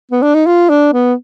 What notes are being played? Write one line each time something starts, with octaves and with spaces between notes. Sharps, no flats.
B3
D4
D#4
F4
D4
B3